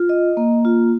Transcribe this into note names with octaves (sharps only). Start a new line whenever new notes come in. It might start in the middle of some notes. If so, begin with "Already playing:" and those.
Already playing: F4
D#5
A#3
F4